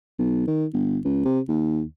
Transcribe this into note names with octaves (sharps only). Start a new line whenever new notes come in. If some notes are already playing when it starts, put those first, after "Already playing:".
B1
D#3
G1
C#2
C3
D#2